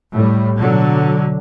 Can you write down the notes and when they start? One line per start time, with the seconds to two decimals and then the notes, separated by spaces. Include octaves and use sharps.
0.12 A2 G3
0.58 B2 D3 F#3